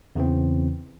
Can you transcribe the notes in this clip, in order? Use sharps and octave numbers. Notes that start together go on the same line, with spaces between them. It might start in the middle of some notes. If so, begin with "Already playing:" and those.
E2 C#3 E3 C4